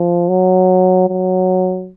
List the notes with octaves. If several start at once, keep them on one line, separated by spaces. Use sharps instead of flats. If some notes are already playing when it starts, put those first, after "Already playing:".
Already playing: F3
F#3
F#3